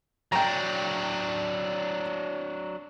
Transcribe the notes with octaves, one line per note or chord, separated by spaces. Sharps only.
F#3 D4 G5 A#5